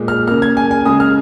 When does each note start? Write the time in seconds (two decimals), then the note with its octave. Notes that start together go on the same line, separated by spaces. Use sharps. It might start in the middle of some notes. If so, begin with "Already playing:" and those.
Already playing: A#2 G#3
0.08 F6
0.27 C#3 A#3 F6
0.42 G#6
0.57 G#5
0.71 G#5
0.85 C#3 G#3 D#6
1.00 F6